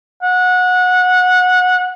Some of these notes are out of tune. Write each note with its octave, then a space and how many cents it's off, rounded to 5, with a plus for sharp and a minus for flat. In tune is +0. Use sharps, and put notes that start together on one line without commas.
F#5 -20